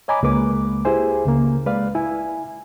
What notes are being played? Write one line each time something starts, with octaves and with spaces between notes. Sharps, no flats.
C#5 D#5 G#5 A#5 B5 D6
C#2 G#3 A#3 B4 D6
E4 G4 G#4 C5 G#5
C#2 C#3 A#3
G#3 B4 D5 F5
E4 G#5